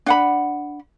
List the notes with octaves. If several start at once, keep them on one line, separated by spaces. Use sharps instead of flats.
D4 F#5 B5